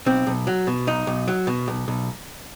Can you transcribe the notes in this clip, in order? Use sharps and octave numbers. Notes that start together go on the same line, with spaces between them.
B1 C4
B1
F#3
B2
B1 D#4
B1
F#3
B2
B1
B1